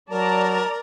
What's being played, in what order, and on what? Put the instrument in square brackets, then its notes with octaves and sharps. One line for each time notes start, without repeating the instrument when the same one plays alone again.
[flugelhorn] F#3 [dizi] A#4 [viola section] D5 A#5 [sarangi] A5